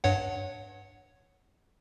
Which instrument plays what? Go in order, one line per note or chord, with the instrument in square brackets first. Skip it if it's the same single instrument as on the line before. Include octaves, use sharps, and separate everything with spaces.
[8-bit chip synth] G2 C#5 F#5